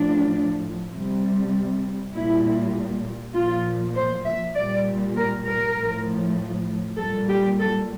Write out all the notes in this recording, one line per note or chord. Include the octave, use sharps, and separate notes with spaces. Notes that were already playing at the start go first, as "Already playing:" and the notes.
Already playing: A2 F3 D4
C3 G3
A#2 G3 E4
A#2 F3 F4
C5
E5
A#2 G3 D5
A#4
A#4
A2 F3
A#2 G3 A4
G4
A4